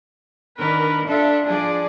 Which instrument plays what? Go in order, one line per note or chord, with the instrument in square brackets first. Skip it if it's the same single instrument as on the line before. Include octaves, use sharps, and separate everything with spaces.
[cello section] D#3 D4 A#4 [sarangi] B4
[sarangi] D4 [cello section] F4 A4 E5
[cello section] F3 G#4 D5 [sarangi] D4